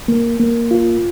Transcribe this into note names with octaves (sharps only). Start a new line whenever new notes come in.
A#3
A#3
F4